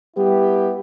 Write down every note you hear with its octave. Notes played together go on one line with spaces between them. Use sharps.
G3 B3 E4 G4